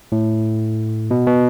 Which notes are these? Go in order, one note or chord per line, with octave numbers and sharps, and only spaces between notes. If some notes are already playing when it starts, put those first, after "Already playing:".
A2
B2
B2